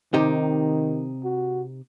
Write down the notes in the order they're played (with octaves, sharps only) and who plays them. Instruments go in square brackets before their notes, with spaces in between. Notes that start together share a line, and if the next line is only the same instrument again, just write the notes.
[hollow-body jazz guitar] C3 D#4 G4 [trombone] D#3
[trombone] F#4